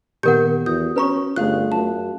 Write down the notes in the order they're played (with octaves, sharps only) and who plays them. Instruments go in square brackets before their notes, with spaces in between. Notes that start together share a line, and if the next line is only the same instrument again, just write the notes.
[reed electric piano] A#2 D#3 B3 [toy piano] G4 A#4 F#5 [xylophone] G6
[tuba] E2 [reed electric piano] F#4 [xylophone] D#6 G6
[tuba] C#4 [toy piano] B4 A#5 C#6
[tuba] G1 [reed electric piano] A3 F4 [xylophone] G#4 F5 F#6
[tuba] F#2 [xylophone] A5